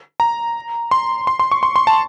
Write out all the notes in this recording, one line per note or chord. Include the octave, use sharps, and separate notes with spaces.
A#5
C6
C6
C6
C#6
C6
C6
A5